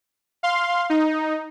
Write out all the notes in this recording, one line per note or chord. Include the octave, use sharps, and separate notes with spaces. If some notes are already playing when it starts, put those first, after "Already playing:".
F5 C6
D#4